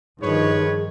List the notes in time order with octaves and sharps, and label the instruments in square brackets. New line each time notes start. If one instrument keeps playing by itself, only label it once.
[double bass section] G2 D#3 F3 [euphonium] D#4 [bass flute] G#4 [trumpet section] B4 C#5